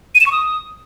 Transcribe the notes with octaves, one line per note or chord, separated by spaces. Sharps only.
D#7
E7
C#6
D#6